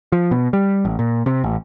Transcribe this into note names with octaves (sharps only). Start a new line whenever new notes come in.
F3
B2
G3
A1
A#2
C3
A1